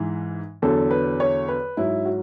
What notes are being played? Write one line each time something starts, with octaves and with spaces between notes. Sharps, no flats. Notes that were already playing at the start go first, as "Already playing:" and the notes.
Already playing: G#2 E3
E2 D3 F#3 A4
B4
C#5
B4
G#2 F#3 E4
F#4